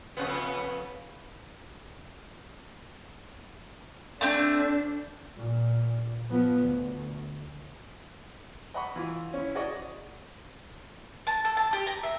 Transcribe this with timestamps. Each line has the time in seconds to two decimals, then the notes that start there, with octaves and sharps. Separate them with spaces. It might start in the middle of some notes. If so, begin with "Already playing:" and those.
0.17 F2 C#3 B3
4.21 A3 C4 D4
5.36 A#2
6.29 F3 B3
6.60 D2
8.74 D#5 F#5 B5 C#6
8.96 E3 F4
9.33 C#4 E4
9.55 F#4 G#4 D5 D#5 C#6
11.27 A5
11.45 A4
11.57 A5
11.73 G4
11.87 A#5
12.03 E5